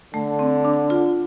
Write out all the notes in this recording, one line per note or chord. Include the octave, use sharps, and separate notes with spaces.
D3 A3
C4
D4
F4